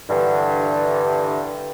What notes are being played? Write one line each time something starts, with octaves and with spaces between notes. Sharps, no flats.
G2 D3 E3